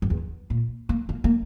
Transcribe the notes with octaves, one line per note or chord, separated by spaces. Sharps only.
F#2
E2
A#2
A#3
A#3
A#3